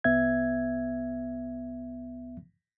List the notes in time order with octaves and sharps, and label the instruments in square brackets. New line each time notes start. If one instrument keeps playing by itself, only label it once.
[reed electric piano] C2 B3 E5 G#6